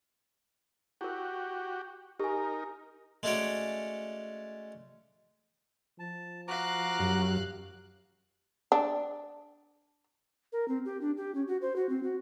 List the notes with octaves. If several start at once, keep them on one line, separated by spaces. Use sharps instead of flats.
E4 F#4 G4 A#4
D#4 G4 A#4 G#5
G#3 A3 C#4 F#4 C#5 D5
F3 A5
F#4 F5 A#5 D6 F#6
F#2 G4
D4
A#4
C4
G4
D4
G4
C#4
F#4
C5
F#4
C4
F#4